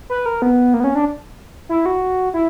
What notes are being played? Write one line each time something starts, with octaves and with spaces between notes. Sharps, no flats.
B4
A#4
B3
A#3
B3
C#4
D4
E4
F#4
E4